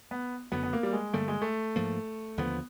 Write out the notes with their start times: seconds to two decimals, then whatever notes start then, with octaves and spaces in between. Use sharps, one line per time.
0.11 B3
0.52 F#1 F#2 D3 F#3 B3
0.63 B3
0.73 A#3
0.83 G3
0.93 G#3
1.13 G2 D3 G3 A3 A#3
1.28 G#3
1.42 A3
1.76 G#2 F3 A#3
2.38 D#2 D3 F3 B3